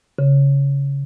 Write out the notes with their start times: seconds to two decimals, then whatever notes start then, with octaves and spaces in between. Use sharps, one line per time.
0.19 C#3